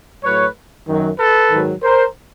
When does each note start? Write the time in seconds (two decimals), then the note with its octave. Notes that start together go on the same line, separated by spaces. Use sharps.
0.23 A2 F#3 B4 C#5
0.87 F#2 D#3 F#3
1.19 A4 B4
1.51 G#2 D#3 F#3
1.83 A#4 C5